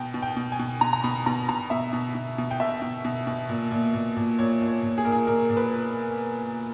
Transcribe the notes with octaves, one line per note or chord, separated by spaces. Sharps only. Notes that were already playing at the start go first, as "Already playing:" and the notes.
Already playing: B2 G5
B2
G5
B2
G#5
B2
B2 A#5
A#5
B2 B5
B2 A#5
B2 A#5
B2 E5
B2
B2
B2
G5
B2 E5
B2
B2
B2
A#2
A#2
A#2
A#2
A#2 C#5
A#2
C#5
A#2
G#4
A#2 A#4
G#4
A#2 A#4
A#2
B4